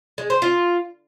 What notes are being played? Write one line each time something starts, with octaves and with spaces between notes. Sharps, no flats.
G#3
C5
F4